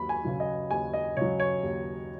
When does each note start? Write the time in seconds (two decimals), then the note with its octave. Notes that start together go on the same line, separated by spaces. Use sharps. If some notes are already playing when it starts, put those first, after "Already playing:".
Already playing: D#2 F#3 B5
0.09 G#5
0.24 C#3 F#3
0.40 D#5
0.71 D#2 G#5
0.93 D#5
1.17 C#3 F#3 C#5
1.40 C#5
1.63 D#2